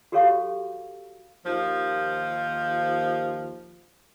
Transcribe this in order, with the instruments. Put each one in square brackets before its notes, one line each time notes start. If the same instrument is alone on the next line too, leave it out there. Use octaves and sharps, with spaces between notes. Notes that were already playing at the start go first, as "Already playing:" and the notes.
[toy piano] F#4 G4 A4 C#5 F5 C#6
[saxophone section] D#2 F3